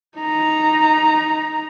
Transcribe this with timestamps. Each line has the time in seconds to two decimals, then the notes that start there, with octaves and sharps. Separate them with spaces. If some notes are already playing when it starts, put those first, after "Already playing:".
0.18 D#4 A#5